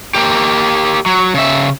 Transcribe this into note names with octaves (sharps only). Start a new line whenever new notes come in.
A#3 G4
F#3
C#3 E5